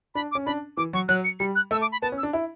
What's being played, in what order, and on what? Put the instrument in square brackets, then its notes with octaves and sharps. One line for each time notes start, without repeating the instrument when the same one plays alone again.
[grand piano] D4 [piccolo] B5
[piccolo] D6
[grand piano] C#4
[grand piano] D4 [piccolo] B5
[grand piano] E3 [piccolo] D6
[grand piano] F#3 [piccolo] C#6
[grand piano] F#3 [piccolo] F#6
[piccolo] C#7
[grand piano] G3 [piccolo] C#7
[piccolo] F#6
[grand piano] A3 [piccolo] E6
[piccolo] D6
B5
[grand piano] B3 [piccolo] A5
[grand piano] C#4
[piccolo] E6
[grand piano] D4
E4